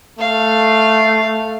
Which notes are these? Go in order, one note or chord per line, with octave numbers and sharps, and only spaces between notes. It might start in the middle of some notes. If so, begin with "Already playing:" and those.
A3 F5